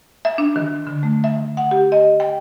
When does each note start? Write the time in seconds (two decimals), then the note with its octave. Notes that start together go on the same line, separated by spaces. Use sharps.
0.25 E5
0.38 D4
0.56 D#3
0.87 D3
1.03 A3
1.24 E5
1.36 D#3
1.57 F#5
1.71 G4
1.92 D#5
2.20 G5